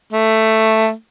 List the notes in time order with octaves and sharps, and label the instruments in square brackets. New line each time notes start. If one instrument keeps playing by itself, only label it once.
[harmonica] A3